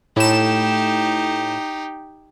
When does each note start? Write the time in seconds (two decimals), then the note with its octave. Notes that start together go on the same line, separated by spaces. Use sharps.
0.16 A2 D#4 G4 E7